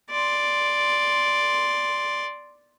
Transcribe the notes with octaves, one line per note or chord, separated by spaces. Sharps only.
D5 C6